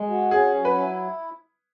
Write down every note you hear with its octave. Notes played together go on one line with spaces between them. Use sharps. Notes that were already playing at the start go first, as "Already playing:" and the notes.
Already playing: G#3
F#4
C#4 G#4
F#3
B4
E4